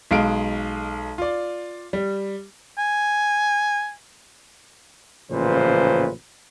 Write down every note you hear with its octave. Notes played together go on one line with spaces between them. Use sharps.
B1 G#3 F5 D7
F4 D5
G3
G#5
A1 A#2 C#3 F3 B4 C5